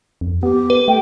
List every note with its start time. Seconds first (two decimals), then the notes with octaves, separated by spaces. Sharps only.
0.21 F2
0.43 B3 G4
0.70 B4
0.88 A3 G5